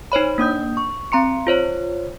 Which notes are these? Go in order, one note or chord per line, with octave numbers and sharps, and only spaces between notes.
D#4 C5 C#5 B5
A#3 D4 D#6 G6
C#6
C4 A#5 C6 C#7
F4 C5 C#5